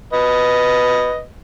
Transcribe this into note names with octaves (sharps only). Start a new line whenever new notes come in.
B4 D#5